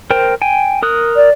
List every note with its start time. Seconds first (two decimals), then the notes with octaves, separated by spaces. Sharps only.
0.10 A#4 C5 G5
0.42 G5 G#5
0.83 A#4 D#6 F#6
1.16 D5